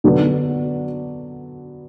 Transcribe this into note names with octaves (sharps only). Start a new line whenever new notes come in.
D3 F#3 B3 D4